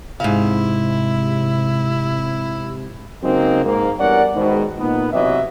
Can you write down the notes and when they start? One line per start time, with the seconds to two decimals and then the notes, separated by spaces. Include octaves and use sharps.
0.20 G#2 C3 E4 F5
3.23 C#3 F#3 G#3 A#3 C4 D#4
3.64 G#2 A#3
3.98 E2 G2 C#4 A#4 D5 F#5
4.36 G#2 B2 D#3
4.78 A#2 B3 D#4
5.13 B1 C3 E3 F#3 D#5 E5